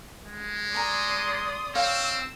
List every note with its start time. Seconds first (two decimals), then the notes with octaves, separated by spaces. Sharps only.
0.23 G#3
0.74 D5 G#5 A#5 C6 D#6
1.75 C4 C#5 F5 G5 E6